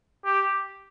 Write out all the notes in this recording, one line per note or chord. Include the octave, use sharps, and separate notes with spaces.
G4